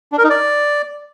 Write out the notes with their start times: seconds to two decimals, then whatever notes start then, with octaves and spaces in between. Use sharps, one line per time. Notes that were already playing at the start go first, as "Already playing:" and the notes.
0.12 D4
0.18 A#4
0.24 D#4
0.30 D5